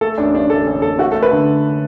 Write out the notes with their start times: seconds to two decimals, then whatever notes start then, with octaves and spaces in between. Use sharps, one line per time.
0.01 A3 A4
0.18 A1 D4
0.34 A1 D4
0.50 A1 A4
0.67 A1
0.82 A1 A4
0.98 A3 F#4
1.12 A4
1.15 A3
1.23 B4
1.31 D3